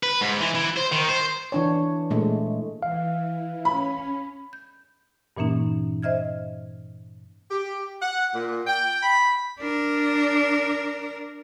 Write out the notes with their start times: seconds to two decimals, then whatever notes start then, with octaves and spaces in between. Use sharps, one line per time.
0.03 B4
0.21 G#2
0.41 E3
0.55 E3
0.77 C5
0.92 D#3
1.09 C5
1.52 E3 D4 C#5
2.10 A#2 G#3 A3
2.83 E3 F5
3.65 C#4 B5
4.53 G6
5.37 G2 A#2 E3 A#3 C#4 D#4
6.03 C5 D#5 E5 F6 G#6
7.50 G4
8.01 F#5
8.34 A#2
8.67 G5
9.03 B5
9.58 D4 A#4